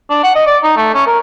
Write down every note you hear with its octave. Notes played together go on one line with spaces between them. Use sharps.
D4
F#5
D#5
D5
D#4
A3
C#4
A#4